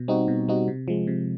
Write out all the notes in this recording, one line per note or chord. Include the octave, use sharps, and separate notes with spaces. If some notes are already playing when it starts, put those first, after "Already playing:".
Already playing: B2
G3 C4 D#4 F#4
B2
G3 C4 D#4 F#4
C3
F3 G#3
C3